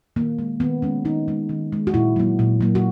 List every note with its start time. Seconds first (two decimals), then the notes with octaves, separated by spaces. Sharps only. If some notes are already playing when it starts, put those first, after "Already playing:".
0.16 D#3 A#3
0.39 G#3
0.60 D#3 B3
0.82 G#3 C#4
1.05 D#3 D#4
1.28 G#3
1.49 D#3
1.72 G#3
1.87 F#4
1.94 A#2 E4
2.16 F#3 A#3
2.39 A#2
2.61 F#3 A#3
2.75 F#4